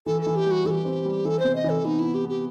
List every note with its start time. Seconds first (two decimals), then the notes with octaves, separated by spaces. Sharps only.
0.06 E3 A4
0.22 E3 A4
0.36 G4
0.46 G3 F#4
0.65 E3 A4
0.71 G4
0.85 C4
1.05 G3
1.25 E3 A4
1.39 C3 C5
1.55 D#5
1.64 E3
1.69 A4
1.85 B3 D#4
1.99 B3 E4
2.14 G4
2.25 B3 G4